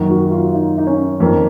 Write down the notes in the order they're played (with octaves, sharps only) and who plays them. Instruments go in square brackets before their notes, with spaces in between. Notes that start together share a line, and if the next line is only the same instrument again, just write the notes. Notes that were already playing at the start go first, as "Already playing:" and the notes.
Already playing: [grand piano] F#2 D#3 F#3 A#3
[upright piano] F#4
F4
D#4
D#4
C#4
[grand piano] F2 D#3 A#3